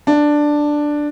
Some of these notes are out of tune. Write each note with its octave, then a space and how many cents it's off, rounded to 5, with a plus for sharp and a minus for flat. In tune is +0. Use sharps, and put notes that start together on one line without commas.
D4 +5